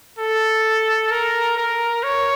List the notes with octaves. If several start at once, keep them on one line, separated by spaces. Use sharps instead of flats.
A4
A#4
A#4
C#5